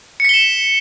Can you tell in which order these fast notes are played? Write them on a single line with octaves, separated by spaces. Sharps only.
C#7 B6 G7 E7